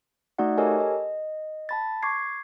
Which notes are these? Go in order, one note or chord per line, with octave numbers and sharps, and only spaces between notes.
A3 D#4 F#4 D5 F#5
G4 A4 A#4 C#5 D#5 G#5
D#5
A5 B5 A6
C#6 D6 G#6 C7